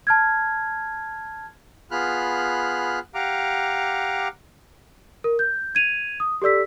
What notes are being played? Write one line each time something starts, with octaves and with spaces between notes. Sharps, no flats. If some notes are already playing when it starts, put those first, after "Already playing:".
A5 F6 G#6
B3 F4 G#4 B5 F6 F#6
G4 F5 F#5 A#5 D6
A#4
G6
G#6 D#7 F7
D#6
G4 A4 D5 E6 B6